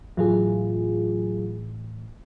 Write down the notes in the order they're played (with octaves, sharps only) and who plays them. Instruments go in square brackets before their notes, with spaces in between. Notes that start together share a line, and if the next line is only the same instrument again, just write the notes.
[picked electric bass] A2 E3 [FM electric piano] F#3 F4 G#4